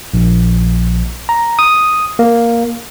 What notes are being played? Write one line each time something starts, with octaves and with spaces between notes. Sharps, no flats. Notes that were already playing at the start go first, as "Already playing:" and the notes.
A#1
A#5
D#6
A#3